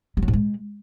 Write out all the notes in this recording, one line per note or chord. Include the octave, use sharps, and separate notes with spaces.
G3
F#3
G#2
G#3